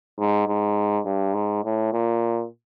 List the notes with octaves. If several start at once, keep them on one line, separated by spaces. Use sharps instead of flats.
G#2
G#2
G2
G#2
A2
A#2